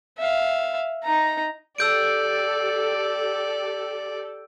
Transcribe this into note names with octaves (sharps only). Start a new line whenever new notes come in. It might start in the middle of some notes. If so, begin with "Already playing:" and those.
E5 F5
D#4 A#5
G4 A4 D5 E6 G6 D7